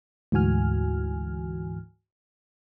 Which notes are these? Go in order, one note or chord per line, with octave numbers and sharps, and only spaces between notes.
D2 G#2 E3 F#4 G#5 F6